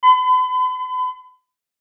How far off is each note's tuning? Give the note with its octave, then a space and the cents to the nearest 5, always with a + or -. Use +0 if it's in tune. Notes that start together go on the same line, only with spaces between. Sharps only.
B5 +40